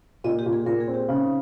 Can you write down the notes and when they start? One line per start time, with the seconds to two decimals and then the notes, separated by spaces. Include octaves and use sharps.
0.24 A#2 D#5
0.39 G4
0.46 A#2
0.53 G#4
0.66 A#2 A#4
0.80 G#4
0.87 C4
0.94 G4
1.08 C#3 D#4